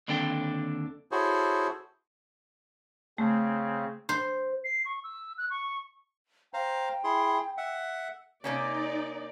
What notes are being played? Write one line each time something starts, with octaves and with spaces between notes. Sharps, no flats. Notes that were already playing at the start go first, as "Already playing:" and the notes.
D#2 D3 C4 D4 A4 G5
E4 F#4 G#4 A4 C5 C#5
C#3 A3 C4
C5
C7
C#6
E6
F#6
C#6
C5 F5 G5 A#5
E4 G#4 C6
E5 F#5
C3 A#3 C#4 D#4 D5